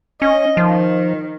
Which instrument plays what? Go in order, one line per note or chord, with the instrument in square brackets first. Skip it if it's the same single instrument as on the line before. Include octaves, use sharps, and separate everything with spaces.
[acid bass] C#4 [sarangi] D#5
[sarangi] D#3 [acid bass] F3